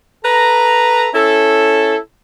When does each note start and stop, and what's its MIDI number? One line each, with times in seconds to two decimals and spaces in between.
0.24 1.08 69
0.24 1.08 71
0.24 1.08 82
1.14 1.96 61
1.14 1.96 64
1.14 1.96 69